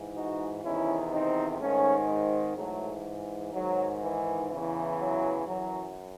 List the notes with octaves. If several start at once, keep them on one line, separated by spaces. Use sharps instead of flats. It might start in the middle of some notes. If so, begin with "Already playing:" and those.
Already playing: G#2 E3
D#4 F#4
E2 C3 D#3 C#4 E4
C4 D#4
G#2 D#3 A3 C#4
G#3 C4
G#2 E3 F#3 A3
G#2 D#3 F#3
E3
E2 C#3 E3
F#3
F#2 E3 F#3